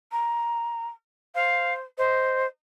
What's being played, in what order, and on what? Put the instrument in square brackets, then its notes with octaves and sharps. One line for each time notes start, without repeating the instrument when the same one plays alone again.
[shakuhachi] A#5
[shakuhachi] C5 [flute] F5
[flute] C5 [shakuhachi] D#5